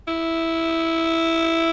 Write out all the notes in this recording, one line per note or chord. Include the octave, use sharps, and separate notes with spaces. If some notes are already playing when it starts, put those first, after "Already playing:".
E4